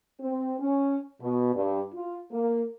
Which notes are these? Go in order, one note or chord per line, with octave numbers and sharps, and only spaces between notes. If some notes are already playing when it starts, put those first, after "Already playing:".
C4
C#4
B2
G2
F4
A#3